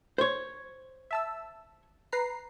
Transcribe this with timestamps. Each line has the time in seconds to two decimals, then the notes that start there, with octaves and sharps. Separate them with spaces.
0.18 C5 C#5
1.11 E5 A5 E6
2.12 B4 A#5 C7